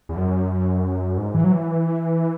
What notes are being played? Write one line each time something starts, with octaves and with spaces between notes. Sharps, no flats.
E2
F#2
G#2
E3
F#3
E3